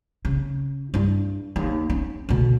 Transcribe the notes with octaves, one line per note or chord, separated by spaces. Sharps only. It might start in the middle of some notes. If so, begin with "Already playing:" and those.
C#3
G2 E4
D#2
C#4
D2 B2